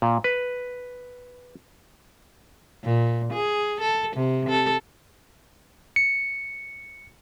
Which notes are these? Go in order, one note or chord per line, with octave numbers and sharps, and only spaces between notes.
A#2
B4
A#2
G#4
A4
C3
A4
C#7